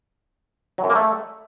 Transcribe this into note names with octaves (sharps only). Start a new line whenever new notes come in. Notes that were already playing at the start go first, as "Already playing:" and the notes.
F#3
F#2
A#3
A3